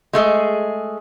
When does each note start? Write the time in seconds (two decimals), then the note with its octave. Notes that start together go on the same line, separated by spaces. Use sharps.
0.13 G#3 A3 G#4 D#5